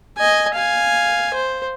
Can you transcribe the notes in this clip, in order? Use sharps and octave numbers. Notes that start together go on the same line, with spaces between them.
D#5 G#5
F5 G#5
C5